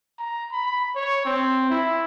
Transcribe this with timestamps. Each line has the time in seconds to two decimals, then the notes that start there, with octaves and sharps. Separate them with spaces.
0.19 A#5
0.52 B5
0.96 C#5
1.25 C4
1.70 E4